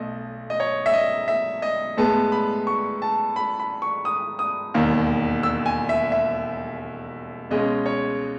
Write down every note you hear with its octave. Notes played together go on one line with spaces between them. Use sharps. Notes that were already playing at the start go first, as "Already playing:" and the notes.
Already playing: B1 B2 A3 D#5
D#5
C#5
E5
D#5
E5
D#5
A2 G#3 B3 A5
B5
C#6
A5
B5
B5
C#6
D#6
D#6
E1 D#2 D#3
E6
G#5
E5
E5
C#2 B2 G#3 C#4 D#5
C#5